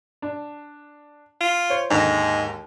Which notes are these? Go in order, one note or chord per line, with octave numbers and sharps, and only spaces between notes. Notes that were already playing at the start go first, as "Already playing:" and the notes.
D4
F4
C5 C#5
D#2 G#2 D3 D#5